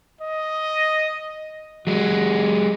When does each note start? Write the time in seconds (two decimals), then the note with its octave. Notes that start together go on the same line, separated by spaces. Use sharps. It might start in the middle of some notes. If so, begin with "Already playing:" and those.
0.21 D#5
1.87 F#3 G#3 F#4